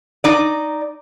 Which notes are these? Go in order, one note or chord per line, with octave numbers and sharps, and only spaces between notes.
D#4 D5